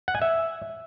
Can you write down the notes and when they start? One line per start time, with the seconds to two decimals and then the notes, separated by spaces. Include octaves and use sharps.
0.08 F#5
0.15 G#5
0.22 E5